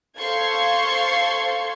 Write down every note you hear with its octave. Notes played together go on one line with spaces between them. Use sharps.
A4 C5 F5 C6 C#6 G#6